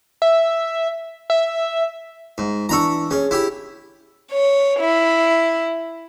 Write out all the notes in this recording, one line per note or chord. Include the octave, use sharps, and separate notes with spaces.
E5
E5
G#2
E3 D4 A#5 B5 C#6 E6
C#4 G#4 C#5
E4 G4
C#5
E4